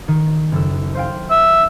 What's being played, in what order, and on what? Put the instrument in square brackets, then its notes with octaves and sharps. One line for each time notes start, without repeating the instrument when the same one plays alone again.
[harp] D#3
F#1 A4 E6
C5 F5 G5
[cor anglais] E5